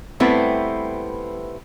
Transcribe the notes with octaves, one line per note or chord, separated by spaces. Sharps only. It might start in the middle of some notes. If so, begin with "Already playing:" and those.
G3 A3 B3 C4 E4 B4